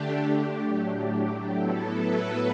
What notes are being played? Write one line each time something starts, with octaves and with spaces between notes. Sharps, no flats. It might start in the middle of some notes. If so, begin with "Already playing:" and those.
Already playing: D3 A3 D4 G4
A2 F#3 A3 D4 G4
G4
A2 F#3 B3 E4 A4
B4